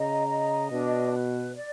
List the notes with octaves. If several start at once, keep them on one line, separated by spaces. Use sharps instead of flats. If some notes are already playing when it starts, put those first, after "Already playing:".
Already playing: C#3 D#5 A#5
D#5
B2 D4
B4
D5